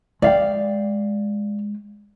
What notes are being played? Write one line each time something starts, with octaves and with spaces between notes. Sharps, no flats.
G#3 D5 F5 G5